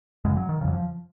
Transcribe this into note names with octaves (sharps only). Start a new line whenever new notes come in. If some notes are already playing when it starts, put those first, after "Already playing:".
F#2 C#3 G#3
F#3
D#3
F2 C#3 F3 F#3
F3